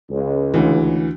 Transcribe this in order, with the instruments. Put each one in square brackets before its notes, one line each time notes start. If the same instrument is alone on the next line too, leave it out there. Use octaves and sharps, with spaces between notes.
[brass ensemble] C#2
[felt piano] D2 E3